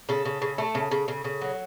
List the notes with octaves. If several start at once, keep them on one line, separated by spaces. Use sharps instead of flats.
C#3 A4
C#3
C#3
A3
C#3
C#3
C#3
C#3
F#3